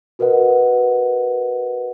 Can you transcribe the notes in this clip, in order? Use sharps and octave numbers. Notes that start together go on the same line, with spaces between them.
F#4 A#4 B4 D#5 F#5